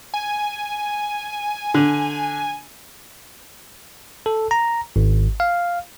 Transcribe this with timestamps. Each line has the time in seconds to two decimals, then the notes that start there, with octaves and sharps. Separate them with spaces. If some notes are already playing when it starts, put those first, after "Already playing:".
0.14 G#5
1.74 D3
4.26 A4
4.51 A#5
4.96 G#1
5.40 F5